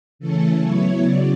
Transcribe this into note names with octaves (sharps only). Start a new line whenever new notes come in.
C#3 E3 A3 C#4 A4
F#3 B3 E4 C#5
C#3 F#3 D5